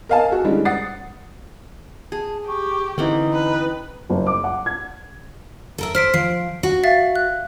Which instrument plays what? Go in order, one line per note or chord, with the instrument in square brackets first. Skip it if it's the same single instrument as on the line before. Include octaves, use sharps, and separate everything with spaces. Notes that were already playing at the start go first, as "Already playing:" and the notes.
[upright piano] A#4 D#5 F5 G#5 A5
F#4 G#4 A4
D3 E3 G3 G#3 C#4
F#5 D#6 A6 C7
[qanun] G#4 [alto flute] A5
[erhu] G4 [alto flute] C#6
[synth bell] D3 [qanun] E3 C4 C#4 [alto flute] D#4
[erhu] B4
[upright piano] F#1
D6
F#5
G#6
[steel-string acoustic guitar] A4 A#4 E5
[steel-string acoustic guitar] C5 [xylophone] F6 B6 D7
[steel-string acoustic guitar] F3 [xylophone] C7
[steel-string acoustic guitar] F#4
[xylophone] E5 F5 A6
F#6